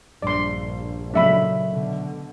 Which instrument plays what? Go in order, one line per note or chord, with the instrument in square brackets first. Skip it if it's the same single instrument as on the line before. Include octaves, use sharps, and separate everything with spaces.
[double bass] A#1 [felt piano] G2 [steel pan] D5 C6
[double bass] A#2 C#3 [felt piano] F#3 A3 D#5 [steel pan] D4 E5 B5
[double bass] B2 D3